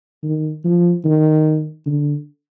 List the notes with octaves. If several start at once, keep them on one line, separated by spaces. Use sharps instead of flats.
D#3
F3
D#3
D3